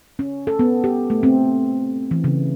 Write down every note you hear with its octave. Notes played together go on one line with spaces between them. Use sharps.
C#4
A4
B3
G4
A3
C4
E3
C#3